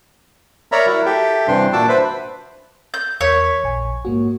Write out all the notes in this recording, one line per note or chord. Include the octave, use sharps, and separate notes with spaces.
A#4 C#5 D5 E5 A#5 B5
E4 F#4 A#4
G4 A4 E5 G5
G2 C3 E3 D4 G5 C6
A#2 D4 F#4 A5 D6 E6
B4 C5 E5 B5
G6
E2 A#4 C#5 B6
A#1 G#5
G#2 A#3 F#4